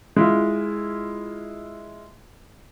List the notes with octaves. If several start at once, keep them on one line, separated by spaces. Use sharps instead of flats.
G#3 E4 F4